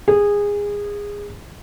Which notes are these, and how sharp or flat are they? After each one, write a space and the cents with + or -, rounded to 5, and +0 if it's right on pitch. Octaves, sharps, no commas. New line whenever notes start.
G#4 -20